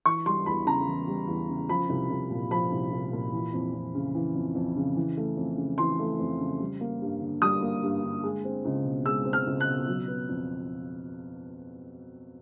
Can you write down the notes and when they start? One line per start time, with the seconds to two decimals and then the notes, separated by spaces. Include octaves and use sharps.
0.06 E3 C#6
0.26 G3 C6
0.46 E2 B5
0.67 C#3 A#5
0.87 E3
1.07 G3
1.28 E2
1.49 C#3
1.69 F3 B5
1.89 C2
2.10 C2
2.31 A#2
2.51 F3 B5
2.72 C2
2.92 C2
3.13 A#2
3.33 E3
3.54 F2
3.74 F2
3.95 C#3
4.15 E3
4.35 F2
4.55 F2
4.77 C#3
4.96 E3
5.17 A3
5.37 F2
5.58 C#3
5.78 E3 C6
5.99 A3
6.19 F2
6.40 C#3
6.60 G3
6.81 A#3
7.02 G2
7.21 D3
7.42 G3 D#6
7.62 A#3
7.83 G2
8.03 D3
8.24 G#3
8.45 C4
8.65 C#2
8.85 B2
9.05 G#3 E6
9.26 C4
9.33 F6
9.47 C#2
9.60 F#6
9.67 B2
9.88 F#3
10.08 B3
10.29 F2